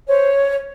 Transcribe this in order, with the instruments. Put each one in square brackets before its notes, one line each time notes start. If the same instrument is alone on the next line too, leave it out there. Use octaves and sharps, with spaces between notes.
[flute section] C5 C#5